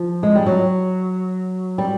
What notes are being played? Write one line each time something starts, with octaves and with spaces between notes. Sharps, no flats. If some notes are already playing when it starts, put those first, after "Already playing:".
Already playing: F3
G#3
G3
F#3
G3